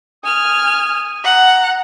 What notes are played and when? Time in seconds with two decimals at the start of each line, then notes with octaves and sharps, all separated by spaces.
0.24 G#5 D#6 F6
1.24 F#5 A#5